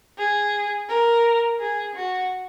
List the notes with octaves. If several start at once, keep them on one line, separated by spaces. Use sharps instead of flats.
G#4
A#4
G#4
F#4